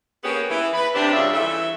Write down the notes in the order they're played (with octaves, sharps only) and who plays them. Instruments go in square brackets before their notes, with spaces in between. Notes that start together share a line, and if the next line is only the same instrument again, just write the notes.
[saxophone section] A#3 B3 C#4 G4 G#4
E3
B4
C3 D4
G2 C#3 F4 E5
E3 A3 E5